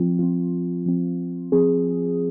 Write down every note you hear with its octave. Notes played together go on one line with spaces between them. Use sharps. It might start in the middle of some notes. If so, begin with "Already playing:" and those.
Already playing: F3 C4 F4
F3 C4 F4
F3 C4
F3 C4 G#4